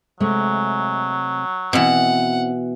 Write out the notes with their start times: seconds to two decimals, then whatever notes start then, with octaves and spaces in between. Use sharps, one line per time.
0.20 C3 F#3 G#3 A3
1.73 B2 E3 C4 E4 F#5